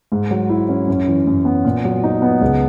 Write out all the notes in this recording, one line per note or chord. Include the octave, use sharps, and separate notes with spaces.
G#2
F#3
E4
C#4
F#2
E3
F#2
B3
A#2
F#3
D#4
B3
C#2